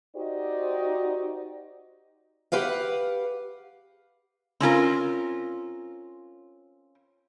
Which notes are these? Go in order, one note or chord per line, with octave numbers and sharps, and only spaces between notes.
D#4 F#4 G4 C5 D5 D#5
G4 B4 F5 F#5
C4 C#4 F4 A#4